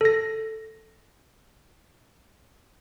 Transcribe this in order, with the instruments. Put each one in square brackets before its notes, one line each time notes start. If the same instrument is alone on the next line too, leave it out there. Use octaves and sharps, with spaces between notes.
[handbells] A4 A#6